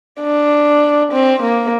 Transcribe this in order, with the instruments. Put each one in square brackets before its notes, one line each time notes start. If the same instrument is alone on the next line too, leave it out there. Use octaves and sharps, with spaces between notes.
[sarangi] D4
C4
A#3